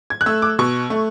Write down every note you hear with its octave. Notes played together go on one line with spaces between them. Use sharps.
G#6
F#6
A3 E6
D6
B2 C#6
A3